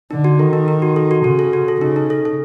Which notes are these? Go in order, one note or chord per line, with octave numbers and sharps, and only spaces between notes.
D3 D#4
F#4
D#3 A4
D#4
D#4
F#4
A4
F#4
C#3 F#4
A4
F#4
A4
C#3 D#4
D#4
A4
A4